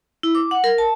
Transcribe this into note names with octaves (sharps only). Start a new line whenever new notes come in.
E4
D6
F#5
A#4
A5